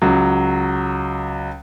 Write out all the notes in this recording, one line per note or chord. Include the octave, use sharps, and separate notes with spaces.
C#2 F#3